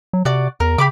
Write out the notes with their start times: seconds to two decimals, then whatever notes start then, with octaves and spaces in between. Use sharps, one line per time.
0.13 F#3
0.25 C3 F#4 D5
0.60 E2 A#4
0.78 C#3 G4 B5 D6